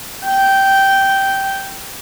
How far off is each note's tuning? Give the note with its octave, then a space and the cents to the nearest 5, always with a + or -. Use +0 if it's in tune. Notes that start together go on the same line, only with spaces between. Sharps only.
G5 -10